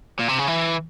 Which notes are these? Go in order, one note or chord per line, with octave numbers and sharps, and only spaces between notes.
A#2
C3
C#3
E3